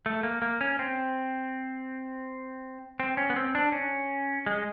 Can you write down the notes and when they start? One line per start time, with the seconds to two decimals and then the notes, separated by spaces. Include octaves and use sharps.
0.06 A3
0.23 A#3
0.42 A#3
0.61 C#4
0.79 C4
3.00 C4
3.17 C#4
3.30 B3
3.36 C4
3.55 D4
3.72 C#4
4.46 G#3